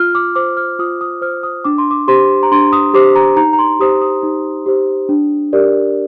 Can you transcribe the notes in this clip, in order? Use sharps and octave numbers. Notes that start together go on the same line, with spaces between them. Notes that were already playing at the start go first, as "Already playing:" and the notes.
Already playing: F4 F6
D6
C5 D6
F6
F4 D#6
D#6
C5 F6
D#6
D4 D6
C6
D6
G4 C5 C6
A#5
D4 C6
D#6
G4 C5 D6
A#5
D#4 A#5
A#5
C6
G4 C5 D#6
D#6
D#4
G4 C5
D4
G4 A#4 D5